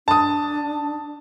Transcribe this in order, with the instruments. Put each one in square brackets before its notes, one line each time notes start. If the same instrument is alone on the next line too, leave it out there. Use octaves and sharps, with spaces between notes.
[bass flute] D4 [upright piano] A5 D#6